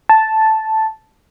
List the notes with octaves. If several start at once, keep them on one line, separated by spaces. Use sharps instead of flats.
A5